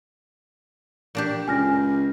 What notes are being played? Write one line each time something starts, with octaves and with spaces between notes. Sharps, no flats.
A#2 D4 G4
C#2 G#5 F6 A#6